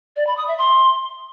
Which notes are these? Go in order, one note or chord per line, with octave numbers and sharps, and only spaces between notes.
D5
B5
D#6
E5
C6